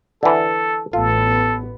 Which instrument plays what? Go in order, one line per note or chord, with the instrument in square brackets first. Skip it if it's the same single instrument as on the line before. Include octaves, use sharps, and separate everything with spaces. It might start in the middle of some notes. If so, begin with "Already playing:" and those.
[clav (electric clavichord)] D3 E3 [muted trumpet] A4
[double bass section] A1 B3 [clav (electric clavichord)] F4 [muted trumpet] A4